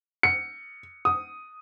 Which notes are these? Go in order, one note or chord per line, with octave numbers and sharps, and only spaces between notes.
C#7
D#6